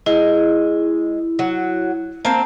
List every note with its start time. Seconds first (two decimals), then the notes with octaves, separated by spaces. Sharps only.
0.06 G#3 E4
1.39 F#3
2.25 A#3 C4 A5